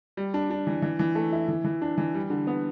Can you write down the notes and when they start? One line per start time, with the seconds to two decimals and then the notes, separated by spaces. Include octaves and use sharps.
0.17 G3
0.34 D4
0.50 D4
0.67 E3
0.82 E3
0.99 E3
1.15 A3
1.32 E4
1.48 E3
1.65 E3
1.82 D4
1.98 E3
2.14 G3
2.30 D3
2.47 B3